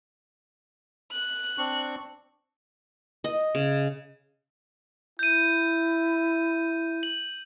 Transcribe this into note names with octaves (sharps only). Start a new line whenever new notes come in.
F#6
C4 D4 C#6
D#5
C#3
E4 G6 D#7
F#7